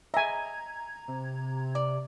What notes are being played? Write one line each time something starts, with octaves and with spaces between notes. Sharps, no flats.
D#5 E5 G#5 A#5 G#6
C3
D5